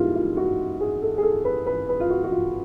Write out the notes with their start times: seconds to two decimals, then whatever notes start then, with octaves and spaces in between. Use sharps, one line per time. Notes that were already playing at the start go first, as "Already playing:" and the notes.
Already playing: G#2 E3 G3 A#3 E4 F4
0.15 F4
0.37 F#4
0.81 G#4
1.02 A4
1.18 G#4
1.23 A4
1.45 B4
1.66 B4
1.89 B4
2.00 F4
2.10 F#4
2.24 F#4
2.32 F4